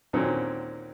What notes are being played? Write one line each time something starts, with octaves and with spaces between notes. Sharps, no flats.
D#2 A#2 D3 F#3 C4 C#4